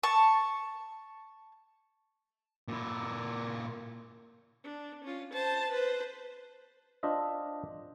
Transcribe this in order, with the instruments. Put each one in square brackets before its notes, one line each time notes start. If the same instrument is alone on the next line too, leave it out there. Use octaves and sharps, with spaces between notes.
[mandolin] A5 C#6
[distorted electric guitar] A#2 E4
[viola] D4
C#4 F4
C5 A5
B4 C5
[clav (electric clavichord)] D4 F4 C5 D#5 E5